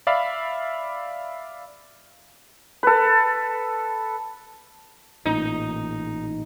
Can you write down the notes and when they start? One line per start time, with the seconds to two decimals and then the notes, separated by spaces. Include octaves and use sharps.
0.07 D5 E5 F5 B5
2.83 A4 B4
5.26 A1 A#2 D#4